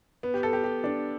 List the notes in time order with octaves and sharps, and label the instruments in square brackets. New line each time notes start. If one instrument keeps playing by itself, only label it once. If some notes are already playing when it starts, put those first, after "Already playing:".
[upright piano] B3
G4
A4
G4
G4
D4